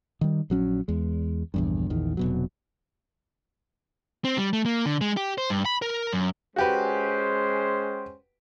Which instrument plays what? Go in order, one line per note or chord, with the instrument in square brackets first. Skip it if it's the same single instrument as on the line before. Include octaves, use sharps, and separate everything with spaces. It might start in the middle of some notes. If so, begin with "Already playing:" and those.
[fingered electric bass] D#3 G3
A#1 F#3 C#4
E2 G#3
A#1 E2 G2
A#1 E2 D#3
F1 B2 F#3
[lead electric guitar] C4
G3
A3
A#3
D3
G#3
G4
C5
G2
B5
A#4
F#2
[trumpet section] G#3 C#4 C5 [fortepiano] F#4 G4 B4